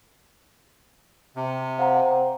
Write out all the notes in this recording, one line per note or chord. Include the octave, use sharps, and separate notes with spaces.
C3
C4 F5 F#5 A#5